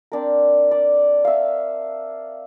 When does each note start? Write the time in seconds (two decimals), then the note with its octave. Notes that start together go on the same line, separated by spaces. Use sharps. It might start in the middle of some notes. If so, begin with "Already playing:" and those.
0.12 C4 D4 A#4
0.71 D5
1.25 E5 F5